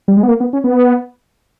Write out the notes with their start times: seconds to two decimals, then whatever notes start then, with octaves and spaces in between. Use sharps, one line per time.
0.08 G3
0.17 G#3
0.23 B3
0.29 A#3
0.40 B3
0.53 C#4
0.64 B3